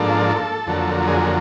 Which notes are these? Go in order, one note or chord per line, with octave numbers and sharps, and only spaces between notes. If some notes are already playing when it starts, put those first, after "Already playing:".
Already playing: G#2 F3 A#3 D4 A4
F2 D3 F#3 A#3
G#4
G#4